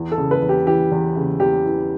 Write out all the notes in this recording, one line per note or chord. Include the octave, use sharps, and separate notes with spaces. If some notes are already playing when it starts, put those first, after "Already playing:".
Already playing: E2
A4
C#3
B4
E2
G4
E3 G4
E2
C#3
E2 G4
E3